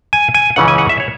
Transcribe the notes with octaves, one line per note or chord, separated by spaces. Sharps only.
G#5
G#5
C#2 C#3 E3 C#4 F#5
G#5
F#5
E5
C#5